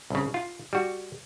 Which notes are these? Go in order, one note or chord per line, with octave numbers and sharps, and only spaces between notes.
C2 C#3
F4
G3 F#4